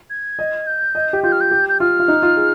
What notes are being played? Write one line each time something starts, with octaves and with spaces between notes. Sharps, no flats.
G#6
D#5
G6
D#5
G4
F4 G6
F6
G6
G4
G6
F4 F6
F4
D#4
F4
G#4